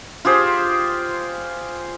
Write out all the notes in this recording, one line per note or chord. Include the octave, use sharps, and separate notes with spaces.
F4 G4 G#4 C5